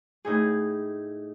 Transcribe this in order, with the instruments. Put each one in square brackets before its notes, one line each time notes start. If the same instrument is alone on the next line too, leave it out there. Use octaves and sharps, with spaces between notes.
[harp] A2 D#4 G#4